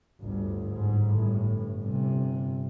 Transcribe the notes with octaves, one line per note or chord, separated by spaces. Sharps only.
G1 D2
G#2
G1 A2
G1 C3